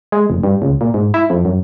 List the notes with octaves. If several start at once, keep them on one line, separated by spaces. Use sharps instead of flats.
G#3
F1
G2
C#2
A#2
G#2
E4
F2
F#2